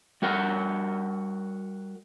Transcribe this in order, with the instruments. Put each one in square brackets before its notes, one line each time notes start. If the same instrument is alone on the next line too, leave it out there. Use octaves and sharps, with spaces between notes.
[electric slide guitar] G3 F#4 A#4 F#5